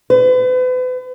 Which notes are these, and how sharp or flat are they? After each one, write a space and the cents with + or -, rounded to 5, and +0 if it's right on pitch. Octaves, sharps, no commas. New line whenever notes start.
B4 +40